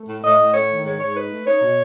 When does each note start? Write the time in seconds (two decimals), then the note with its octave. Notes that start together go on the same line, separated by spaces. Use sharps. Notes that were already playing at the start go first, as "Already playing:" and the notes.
Already playing: A3
0.09 A2
0.24 A2 D#5
0.39 A2
0.54 A3 C#5
0.70 D#3
0.85 G#2 C#5
1.00 G#2 C#5
1.15 D#4 B4
1.30 A3
1.46 D#4 C#5
1.62 B2